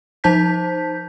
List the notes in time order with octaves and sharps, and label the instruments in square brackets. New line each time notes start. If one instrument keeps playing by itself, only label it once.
[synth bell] F3 D#4 C5 A5 G6 B6